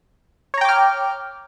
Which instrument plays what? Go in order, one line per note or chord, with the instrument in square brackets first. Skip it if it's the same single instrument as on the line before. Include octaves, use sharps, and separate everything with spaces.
[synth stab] C#5
A#5
G5
D6
F6